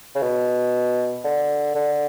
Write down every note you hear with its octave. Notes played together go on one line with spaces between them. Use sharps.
C#3
B2
D3
D3